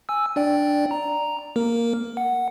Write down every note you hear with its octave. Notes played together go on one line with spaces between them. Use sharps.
G#5 E6
D4 D5 G5
A#5
A#3 A#4
F#5